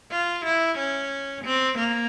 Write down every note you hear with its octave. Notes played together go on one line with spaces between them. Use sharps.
F4
E4
C#4
C4
A#3